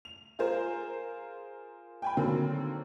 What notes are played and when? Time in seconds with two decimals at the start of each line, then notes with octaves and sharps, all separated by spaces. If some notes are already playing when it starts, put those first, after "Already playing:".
0.05 F7
0.39 F4 G#4 A#4 C5
2.02 G5 G#5 B5
2.17 D3 D#3 F#3 A#3 C4